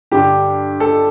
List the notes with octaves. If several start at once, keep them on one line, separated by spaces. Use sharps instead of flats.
G2 D3 G4
A4